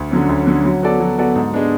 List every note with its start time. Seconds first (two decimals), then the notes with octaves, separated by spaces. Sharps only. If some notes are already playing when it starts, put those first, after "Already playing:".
Already playing: D2
0.11 D3 F#3 C#4
0.29 D2
0.47 D3 F#3 C#4
0.65 F#3
0.82 B3 F#4 A4 D5
1.00 F#3
1.18 B3 F#4 A4 D5
1.36 G#2
1.54 G#3 B3 D4